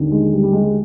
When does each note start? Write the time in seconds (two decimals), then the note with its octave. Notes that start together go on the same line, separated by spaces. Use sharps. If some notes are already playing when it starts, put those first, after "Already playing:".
Already playing: D#2 D3
0.11 G#3
0.32 G3
0.43 G3
0.53 G#3